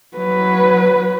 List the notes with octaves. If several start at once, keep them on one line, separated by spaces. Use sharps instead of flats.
F#3 B4